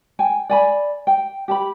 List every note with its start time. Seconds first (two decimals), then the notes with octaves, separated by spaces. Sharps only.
0.19 G5 G#5
0.50 D5 G#5 B5
1.07 G5
1.48 G4 A5 B5